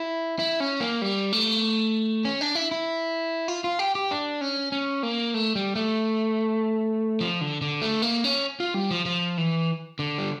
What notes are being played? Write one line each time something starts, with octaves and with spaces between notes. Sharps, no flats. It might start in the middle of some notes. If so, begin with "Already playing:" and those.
Already playing: E4
E4
C#4
A#3
G3
A3
C#4
D4
E4
E4
F4
F4
G4
G4
D4
C#4
C#4
A#3
A3
G3
A3
F3
D3
D3
A3
A#3
C#4
F4
G3
F3
F3
E3
D3
G3